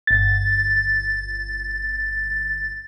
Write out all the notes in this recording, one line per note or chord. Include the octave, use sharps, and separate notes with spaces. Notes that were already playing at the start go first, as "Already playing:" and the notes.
G1 A6